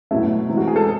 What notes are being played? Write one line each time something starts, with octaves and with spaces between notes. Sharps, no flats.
B2 F#3 A3 E4
C3 E3 G#3
F#4
G#4
A4